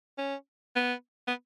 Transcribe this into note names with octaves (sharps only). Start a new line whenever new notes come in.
C#4
B3
B3